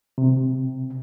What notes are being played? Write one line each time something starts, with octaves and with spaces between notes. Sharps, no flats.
C3